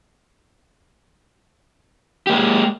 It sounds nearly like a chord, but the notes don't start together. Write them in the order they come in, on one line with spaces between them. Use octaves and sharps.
G4 A#3 G#3